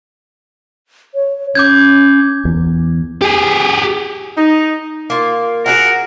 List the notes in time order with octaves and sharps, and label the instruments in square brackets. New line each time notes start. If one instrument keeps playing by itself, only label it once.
[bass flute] C#5
[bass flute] C#4 [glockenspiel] D6 G6 G#6
[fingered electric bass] E2
[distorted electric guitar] G4 G#4
[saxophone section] D#4
[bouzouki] A#3 F4
[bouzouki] F#4 G#4 F#5 [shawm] A#4